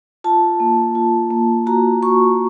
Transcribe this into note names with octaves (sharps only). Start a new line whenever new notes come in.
F4 A5
A#3
F4
A#3
F#4 A#5
F#4 C#6